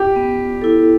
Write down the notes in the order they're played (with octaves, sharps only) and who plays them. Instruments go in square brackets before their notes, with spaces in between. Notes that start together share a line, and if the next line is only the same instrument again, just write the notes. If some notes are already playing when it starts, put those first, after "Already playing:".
Already playing: [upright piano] G4
[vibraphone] B3
E4 A4